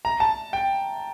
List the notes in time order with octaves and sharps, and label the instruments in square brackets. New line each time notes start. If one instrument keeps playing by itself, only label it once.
[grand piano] A#5
A5
G5